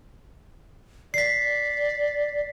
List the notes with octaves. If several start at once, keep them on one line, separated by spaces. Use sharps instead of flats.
D5 B6 C7